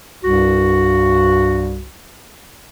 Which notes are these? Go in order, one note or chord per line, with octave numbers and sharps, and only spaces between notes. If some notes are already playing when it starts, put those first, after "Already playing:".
C2 G2 F#4